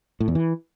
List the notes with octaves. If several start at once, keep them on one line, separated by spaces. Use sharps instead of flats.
A2
E2
E3